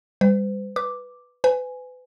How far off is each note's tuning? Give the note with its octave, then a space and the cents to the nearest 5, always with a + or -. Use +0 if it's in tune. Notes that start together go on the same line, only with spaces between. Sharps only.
G3 +25 C5 -45
B4 +0 D6 +0
B4 +30 G#5 +0